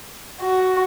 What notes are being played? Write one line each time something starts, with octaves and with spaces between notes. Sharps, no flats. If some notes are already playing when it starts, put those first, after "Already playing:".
F#4